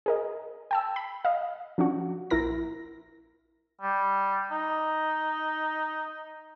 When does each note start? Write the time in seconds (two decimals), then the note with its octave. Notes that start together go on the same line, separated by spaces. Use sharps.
0.06 G#4 A#4 D#5
0.71 G5 A5 E6
0.96 B5
1.25 D#5 F5
1.78 F3 C#4 D4 F#4
2.30 A#1 E4 A#4 A#6
3.81 G3
4.52 D#4